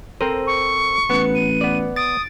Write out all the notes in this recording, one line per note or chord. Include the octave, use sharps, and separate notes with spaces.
C4 A4 A#4 C5
C#6
A1 B3 B4 C#7
D#7
B3 D5
D#6 A6 D7